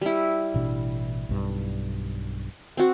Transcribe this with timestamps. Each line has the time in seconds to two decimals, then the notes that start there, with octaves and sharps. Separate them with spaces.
0.01 G3 E4
0.54 A1 B2 D4
1.29 B1 G2
2.77 C4 F#4